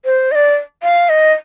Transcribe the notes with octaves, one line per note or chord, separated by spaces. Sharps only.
C5
D#5
D5
F5
D#5